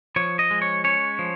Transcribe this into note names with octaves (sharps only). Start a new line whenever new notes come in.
F3 C#5
D#5
G#3
C#5
C#4 C#5
F3